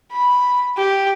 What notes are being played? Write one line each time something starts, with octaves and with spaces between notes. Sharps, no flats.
B5
G4